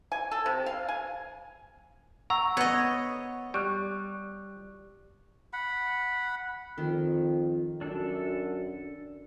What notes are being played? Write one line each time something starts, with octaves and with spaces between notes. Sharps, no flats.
G#5
A4
C3
F5
G#5
F#5 A#5 C#6 E6
B3 C#5 D#5
G3 C#6 F#6
F#5 B5
F2 D#3
F#2 D4 A4